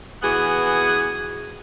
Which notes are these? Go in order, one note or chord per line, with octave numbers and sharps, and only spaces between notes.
E3 B3 F#4 G#4